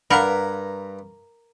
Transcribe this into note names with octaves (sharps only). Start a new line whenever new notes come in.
G2 A#4 B4 F5 F#5 A#5 B5